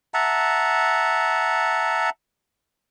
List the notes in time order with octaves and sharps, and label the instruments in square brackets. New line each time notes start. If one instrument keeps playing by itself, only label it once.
[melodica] E5 F#5 A5 A#5